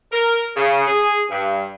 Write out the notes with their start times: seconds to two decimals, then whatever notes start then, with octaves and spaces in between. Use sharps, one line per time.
0.11 A#4
0.56 C#3
0.87 G#4
1.30 G2